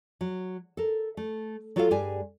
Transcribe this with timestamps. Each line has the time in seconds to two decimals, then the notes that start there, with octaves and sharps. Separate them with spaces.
0.21 F#3
0.77 A4 A#4
1.17 A3
1.76 F#3 F4 F#4 A4 D#5 F5
1.91 G2 G3 G#4 G#5